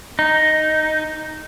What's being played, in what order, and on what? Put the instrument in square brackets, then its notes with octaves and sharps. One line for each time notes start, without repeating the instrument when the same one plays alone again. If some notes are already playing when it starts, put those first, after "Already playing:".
[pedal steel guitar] D#4